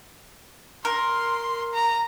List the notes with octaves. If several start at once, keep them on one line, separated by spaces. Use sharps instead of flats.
A#4 C6
A#5